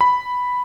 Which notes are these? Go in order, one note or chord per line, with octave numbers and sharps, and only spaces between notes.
B5